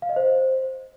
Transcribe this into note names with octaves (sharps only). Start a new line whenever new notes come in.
F5
D#5
C5